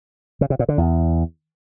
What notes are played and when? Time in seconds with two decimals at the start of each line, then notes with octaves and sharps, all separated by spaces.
0.41 C#3
0.50 C3
0.59 A#2
0.69 D3
0.78 E2